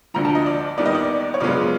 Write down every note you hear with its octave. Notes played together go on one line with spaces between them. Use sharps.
D2 D3 F3 A#5
A5
D#5
D5
D#2 D#3 G3 B3 D5
D#5
D5
C#5
F#2 C#3 F3 G#3 B3 D5